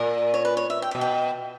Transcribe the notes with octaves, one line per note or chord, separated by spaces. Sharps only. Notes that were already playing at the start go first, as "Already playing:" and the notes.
Already playing: A#2 A#4
C#5
B4
C#5
E5
G5
B2 E5
G5